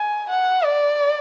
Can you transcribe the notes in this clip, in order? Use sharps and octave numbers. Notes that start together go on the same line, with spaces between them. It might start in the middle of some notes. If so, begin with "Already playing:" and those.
Already playing: G#5
F#5
D5